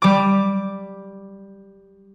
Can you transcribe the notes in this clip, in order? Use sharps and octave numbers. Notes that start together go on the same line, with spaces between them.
G3 D6